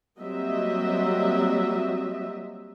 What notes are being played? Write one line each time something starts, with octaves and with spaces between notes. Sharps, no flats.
F#3 G3 A#3 C4 D#5 E5